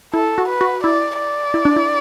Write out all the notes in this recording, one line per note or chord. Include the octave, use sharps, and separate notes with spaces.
E4 A4
F#4
B4
F#4
E4 D5
D5
E4
D4
E4